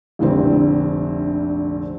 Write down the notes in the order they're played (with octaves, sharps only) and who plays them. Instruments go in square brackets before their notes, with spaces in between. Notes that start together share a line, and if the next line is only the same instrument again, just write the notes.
[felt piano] F1 A#1 D3 C4